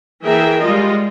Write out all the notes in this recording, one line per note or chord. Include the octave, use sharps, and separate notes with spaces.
E3 A#3 G#4 A#4 E5 G5
G3 G#3 F4 D#5